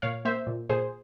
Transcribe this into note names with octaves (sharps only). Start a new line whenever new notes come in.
A#2 C#5 F5
A#3 C5 E5
A#2
A#2 G#4 C5